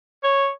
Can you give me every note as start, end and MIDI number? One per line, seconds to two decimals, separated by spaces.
0.24 0.49 73